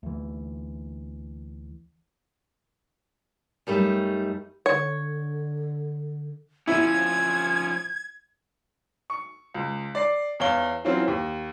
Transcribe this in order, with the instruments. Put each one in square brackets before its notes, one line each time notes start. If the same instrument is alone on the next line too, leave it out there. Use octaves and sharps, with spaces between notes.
[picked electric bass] D2 E3
[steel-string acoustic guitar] F#2 G3 A3 D#4
[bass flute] D3 [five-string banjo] C#5
[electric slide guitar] F3 C#4 [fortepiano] E4 [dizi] G#6
[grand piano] C#6
C#2
D5 C7
E2 C#5 F5 G7
E3 F#3 C4 C#4 F4
D#2